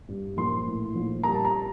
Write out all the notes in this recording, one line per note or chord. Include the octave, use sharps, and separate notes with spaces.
G2
A#1 C6
A2
A#1
G3 A#5
A5
A#5